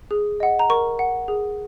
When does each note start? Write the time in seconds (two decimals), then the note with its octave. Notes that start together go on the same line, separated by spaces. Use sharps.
0.11 G#4
0.40 D#5 F#5
0.59 A#5
0.69 A#4 C#6
0.99 F#5
1.28 G#4